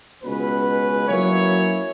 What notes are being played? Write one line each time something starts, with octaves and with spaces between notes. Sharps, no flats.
C#2 B2 B3 C#4 B4
F#3 A#3 C#4 E4 C#5